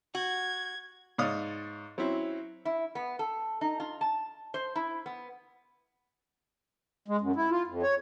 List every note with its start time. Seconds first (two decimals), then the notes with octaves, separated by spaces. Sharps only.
0.15 F#4 G#6
1.18 G#2 C#5 D5 F5 D#6 F6
1.98 F#3 C4 C#4 E4
2.65 E4
2.95 B3
3.19 A4
3.61 D#4
3.80 F4
4.01 A5
4.54 C5
4.76 E4
5.06 B3
7.08 G#3
7.21 F#2
7.36 E4
7.51 F4
7.67 F2
7.83 C#5